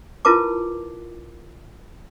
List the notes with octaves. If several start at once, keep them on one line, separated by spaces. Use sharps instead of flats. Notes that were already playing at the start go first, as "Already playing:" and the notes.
E4 F4 A#4 B4 A5 D6